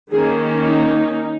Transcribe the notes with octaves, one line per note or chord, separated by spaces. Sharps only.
D#3 A#3 C#4 G#4
D#4